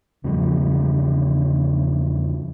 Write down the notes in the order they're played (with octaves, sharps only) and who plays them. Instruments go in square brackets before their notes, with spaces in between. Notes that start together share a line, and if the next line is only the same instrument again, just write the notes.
[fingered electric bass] E2 C#3 F3 G3